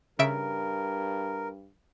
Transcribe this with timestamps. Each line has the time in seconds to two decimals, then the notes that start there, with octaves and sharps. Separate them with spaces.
0.19 G2 C#3 A#4 E5 D7